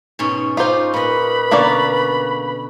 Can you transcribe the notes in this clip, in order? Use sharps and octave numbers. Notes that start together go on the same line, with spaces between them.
G#2 B2 C#4
C#4 D#4 F4 B4 C5 D6
A#2 B4 D#5 B5
B2 D3 A#3 C#4 A#4 D5